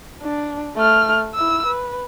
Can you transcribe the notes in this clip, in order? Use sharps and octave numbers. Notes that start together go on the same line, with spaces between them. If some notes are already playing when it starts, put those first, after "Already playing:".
D4
A3 F6
E4 E6
B4